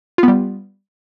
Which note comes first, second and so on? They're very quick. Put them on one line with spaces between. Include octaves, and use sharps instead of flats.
F4 B3 G3